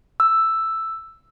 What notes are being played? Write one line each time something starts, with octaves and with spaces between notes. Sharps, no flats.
E6